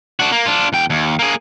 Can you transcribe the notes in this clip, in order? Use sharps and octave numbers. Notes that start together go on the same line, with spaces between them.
D4 F#4
A#3
D4 F4
E2 G5
D#2
A#3 G#4